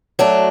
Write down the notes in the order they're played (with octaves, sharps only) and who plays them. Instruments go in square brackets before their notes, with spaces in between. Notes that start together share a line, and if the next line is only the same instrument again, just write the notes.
[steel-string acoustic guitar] F#3 A3 D4